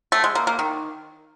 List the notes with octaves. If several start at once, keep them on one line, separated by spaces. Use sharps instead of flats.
A3
G#3
A#3
A#3
D#3